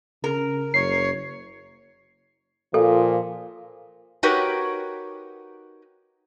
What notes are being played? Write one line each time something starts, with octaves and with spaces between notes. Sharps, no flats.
C#3 A#4
F#1 C#5 C7
A#2 F3 A4
D#4 F#4 G4 A#4 B4 C#5